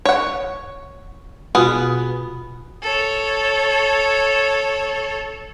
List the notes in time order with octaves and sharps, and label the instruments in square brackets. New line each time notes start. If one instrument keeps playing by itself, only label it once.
[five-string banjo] C#5 F#5
[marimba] B2 F4 F#4 [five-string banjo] B3 G#4
[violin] A4 C#5